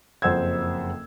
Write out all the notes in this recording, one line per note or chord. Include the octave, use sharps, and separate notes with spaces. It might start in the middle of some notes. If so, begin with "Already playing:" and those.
F#1 F2 C5 F#5 E6 G#6